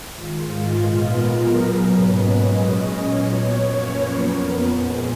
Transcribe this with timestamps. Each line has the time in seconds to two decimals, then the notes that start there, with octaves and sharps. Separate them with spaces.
0.14 G#2 D#3 G#3 F4
0.71 A#2 G#3 B3
1.00 A#4
1.28 B2 F#3 B3
1.56 G#4
1.85 G#2 F#3 A#3 C#4 B4
2.14 D#5
2.42 A#2 G#3 C#4 D#5
2.99 A#2 F#3 B3 C#5
3.56 F#2 F3 A#3 C#4
3.84 B4
4.13 F2 F3 B3 A#4
4.41 A#4
4.70 A#2 F3 G#3 G#4